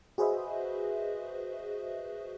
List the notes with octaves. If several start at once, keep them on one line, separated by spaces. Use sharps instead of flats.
F#4 G#4 B4 C5 D#5 E5